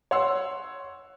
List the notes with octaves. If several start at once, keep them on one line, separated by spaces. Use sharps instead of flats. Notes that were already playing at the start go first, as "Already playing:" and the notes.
C#5 F#5 C6 E6